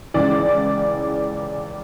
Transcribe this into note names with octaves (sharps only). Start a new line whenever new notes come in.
C#2 C#3 E3 D5